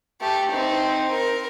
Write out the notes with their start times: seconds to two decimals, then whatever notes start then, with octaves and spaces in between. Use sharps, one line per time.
0.21 A3 G4
0.51 C4 D#4
1.11 A#4